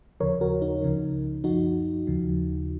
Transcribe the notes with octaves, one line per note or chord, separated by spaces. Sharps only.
D#2 C#3 F3 A#4 C#5
F#4 A#4
D#4
C#2 C#3 F3
F#2 F3 D#4 F#4
D#2 C#3 F3